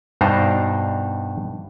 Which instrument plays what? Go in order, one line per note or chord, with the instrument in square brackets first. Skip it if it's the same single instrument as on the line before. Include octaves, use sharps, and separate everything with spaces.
[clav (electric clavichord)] G2 B2 D4 D#4 C5 A#5